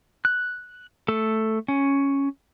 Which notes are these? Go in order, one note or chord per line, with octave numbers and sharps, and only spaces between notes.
F#6
A3 A4
C#4